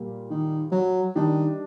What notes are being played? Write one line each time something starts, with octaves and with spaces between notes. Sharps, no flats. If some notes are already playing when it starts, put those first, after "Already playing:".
Already playing: A#2 G3 A#3
D#3
F#3
D#3 G3 D4 G4